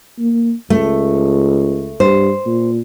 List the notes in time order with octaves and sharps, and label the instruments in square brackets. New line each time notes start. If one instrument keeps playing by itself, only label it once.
[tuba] A#3
[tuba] C#2 [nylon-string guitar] A3
[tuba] G2 [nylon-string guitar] C5
[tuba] A#2